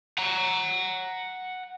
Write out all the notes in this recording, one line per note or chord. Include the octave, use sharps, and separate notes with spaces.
F#5 A#5